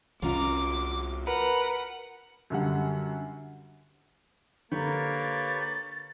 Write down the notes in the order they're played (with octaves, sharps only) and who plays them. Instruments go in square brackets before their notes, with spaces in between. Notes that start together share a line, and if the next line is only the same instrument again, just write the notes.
[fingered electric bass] C2 C#4 [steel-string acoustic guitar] F4 F#4 A#5 [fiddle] D6
[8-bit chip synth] A#4 B4 [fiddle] F#5
[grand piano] F#2 D3 G3 F#5
[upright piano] D3 [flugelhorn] A#3 [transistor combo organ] G4 B4 C#5 [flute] A6